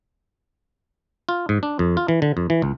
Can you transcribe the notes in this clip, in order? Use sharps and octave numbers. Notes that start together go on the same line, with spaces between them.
F4
G#2
D4
F2
F4
E3
D3
F2
E3
C#2